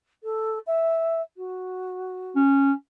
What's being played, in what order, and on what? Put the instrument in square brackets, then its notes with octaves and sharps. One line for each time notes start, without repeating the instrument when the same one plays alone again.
[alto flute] A4
E5
F#4
[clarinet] C#4